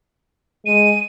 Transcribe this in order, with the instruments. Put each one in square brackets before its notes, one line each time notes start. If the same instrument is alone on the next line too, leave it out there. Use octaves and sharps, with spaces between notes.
[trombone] G#3 [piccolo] D#7